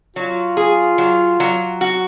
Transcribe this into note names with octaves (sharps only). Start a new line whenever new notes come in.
F#3 F4
G#4
F#3
F#3
F#4